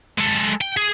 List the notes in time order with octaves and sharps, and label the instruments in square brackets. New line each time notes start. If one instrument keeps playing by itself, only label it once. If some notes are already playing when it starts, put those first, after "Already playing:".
[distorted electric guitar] G#3 A4
G5
G#4